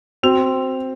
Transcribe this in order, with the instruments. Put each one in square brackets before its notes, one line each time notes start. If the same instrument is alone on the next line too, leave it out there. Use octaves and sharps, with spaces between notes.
[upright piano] C4 [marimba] F#4